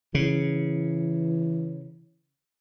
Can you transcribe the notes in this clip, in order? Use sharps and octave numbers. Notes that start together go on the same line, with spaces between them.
C#3 E3